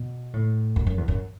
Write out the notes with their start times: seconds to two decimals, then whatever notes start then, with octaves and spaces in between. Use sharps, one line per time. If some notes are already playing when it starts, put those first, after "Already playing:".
Already playing: B2
0.33 A2
0.76 F#2
0.87 F#2
0.98 E2
1.08 F#2